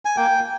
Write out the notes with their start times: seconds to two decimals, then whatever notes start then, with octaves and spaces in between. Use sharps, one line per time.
0.05 G#5
0.16 A#3 G5